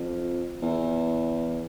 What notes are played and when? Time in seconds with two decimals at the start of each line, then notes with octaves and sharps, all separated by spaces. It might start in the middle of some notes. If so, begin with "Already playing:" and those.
Already playing: F2
0.62 E2